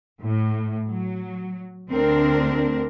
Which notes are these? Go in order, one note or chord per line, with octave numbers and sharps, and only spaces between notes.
A2
F#3
D2 C4 D4 A#4